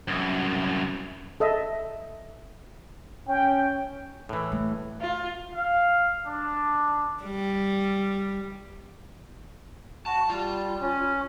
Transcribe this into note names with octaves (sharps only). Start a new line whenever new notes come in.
C2 F#2
A4 D#5 E5
C#4 G5
A2 E3
A3
F4
F5
D4
G3
F#4 A5
G3 F4
C#4